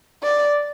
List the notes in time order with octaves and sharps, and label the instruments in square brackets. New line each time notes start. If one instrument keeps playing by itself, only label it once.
[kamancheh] D5